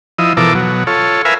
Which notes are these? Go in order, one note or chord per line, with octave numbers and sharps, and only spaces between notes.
F3 E4 D#5
B2 E3 F3 A4 A#4 D6
B2 F#3
F4 A4 C#5
A#4 B4 E5 F5 G#5